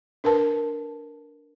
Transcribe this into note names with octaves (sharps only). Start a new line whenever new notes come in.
D4 A#4 B4 A5